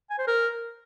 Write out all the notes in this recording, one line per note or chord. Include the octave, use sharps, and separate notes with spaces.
G#5
C5
A#4